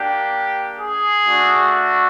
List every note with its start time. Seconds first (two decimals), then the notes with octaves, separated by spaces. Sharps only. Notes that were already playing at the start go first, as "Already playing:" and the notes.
Already playing: A#3 D4 G4
0.78 G#4
1.23 A3 D4 F#4